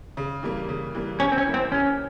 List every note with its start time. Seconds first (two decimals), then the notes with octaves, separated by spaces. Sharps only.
0.17 C#3
0.43 E3 G3 A#3
0.69 C#3
0.95 E3 G3 A#3
1.20 C3 C#4
1.32 C4
1.38 C#4
1.46 E3 A#3 E4
1.54 C4
1.72 C3 C#4